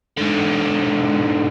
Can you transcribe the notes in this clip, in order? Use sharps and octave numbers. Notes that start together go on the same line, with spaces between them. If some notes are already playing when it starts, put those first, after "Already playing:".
G#2 D3